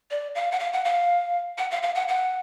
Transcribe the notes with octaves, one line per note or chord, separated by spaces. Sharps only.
D5
F5
F#5
F5
F#5
F5
F#5
F5
F5
F#5
F#5